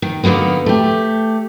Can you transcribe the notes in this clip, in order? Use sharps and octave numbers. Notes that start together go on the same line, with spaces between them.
D#3
D3 D#3 G3 A#3 B3
A3 G4